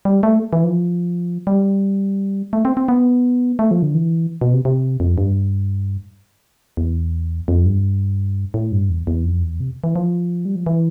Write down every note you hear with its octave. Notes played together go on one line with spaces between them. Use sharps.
G3
A3
E3
F3
G3
A3
C4
C4
B3
A3
F3
D3
E3
B2
C3
C3
F2
G2
E2
F2
G2
A2
G2
E2
E2
F2
E2
C3
E3
F3
G3
F3
E3